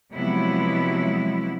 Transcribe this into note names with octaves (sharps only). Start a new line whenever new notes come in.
C3 F3 F#3 G#3 B3 E4